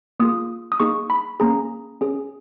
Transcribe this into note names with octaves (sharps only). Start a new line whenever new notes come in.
A#3 F4 G#4 D#6
D#6
A#3 D#4 G#4 C#6
B5
A#3 C#4 G#4 A#5
C#4 G#4